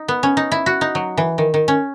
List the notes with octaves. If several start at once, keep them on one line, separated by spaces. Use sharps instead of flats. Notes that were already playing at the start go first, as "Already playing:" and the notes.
Already playing: D#4
B3
C#4
D#4
E4
F#4
D#4
F#3
E3
D#3
D#3
C#4